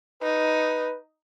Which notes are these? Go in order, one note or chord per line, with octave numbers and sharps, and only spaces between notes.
D#4 B4